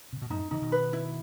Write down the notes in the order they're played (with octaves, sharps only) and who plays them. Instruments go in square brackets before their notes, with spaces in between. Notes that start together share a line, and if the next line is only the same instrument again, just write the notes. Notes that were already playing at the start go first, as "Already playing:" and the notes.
[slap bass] C3
B2
[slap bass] F#2 A2 [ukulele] D#4
[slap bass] C3 E3 [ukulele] D#4
[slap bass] B2 D#3
[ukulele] B4
E4